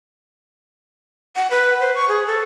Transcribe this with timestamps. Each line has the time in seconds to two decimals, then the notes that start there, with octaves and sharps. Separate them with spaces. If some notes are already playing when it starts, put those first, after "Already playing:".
1.36 F#5
1.51 B4
1.80 C5
1.95 C#6
2.09 G#4
2.27 A4